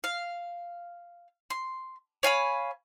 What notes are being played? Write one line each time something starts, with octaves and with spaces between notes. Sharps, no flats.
F5
C6
C#5 F5 G#5 B5